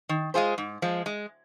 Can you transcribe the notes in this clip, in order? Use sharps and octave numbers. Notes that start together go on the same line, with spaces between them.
D#3
G#3 F4 G#4 C5
G#2
F3 G#3
G#3